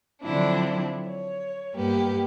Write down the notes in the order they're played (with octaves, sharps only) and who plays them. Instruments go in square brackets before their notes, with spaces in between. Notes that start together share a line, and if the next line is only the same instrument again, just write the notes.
[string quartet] D3 F3 F#3 C4 D4 E4
C#5
G2 A#3 B3 G4